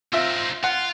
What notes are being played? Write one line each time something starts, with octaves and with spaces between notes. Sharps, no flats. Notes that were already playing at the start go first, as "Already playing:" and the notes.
C4 D#4 F4 E5
F4 F#5